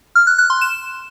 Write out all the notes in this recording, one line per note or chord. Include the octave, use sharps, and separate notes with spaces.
F6
F#6
F#6
C6
E7